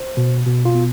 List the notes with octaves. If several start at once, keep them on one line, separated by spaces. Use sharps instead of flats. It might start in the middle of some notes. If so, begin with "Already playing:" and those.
Already playing: C5
B2
B2
F4
B3